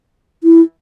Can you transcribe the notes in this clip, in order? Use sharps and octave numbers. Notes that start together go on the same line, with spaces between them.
E4